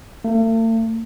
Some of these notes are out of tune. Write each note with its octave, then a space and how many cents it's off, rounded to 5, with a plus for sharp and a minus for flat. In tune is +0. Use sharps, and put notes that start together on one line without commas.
A3 +45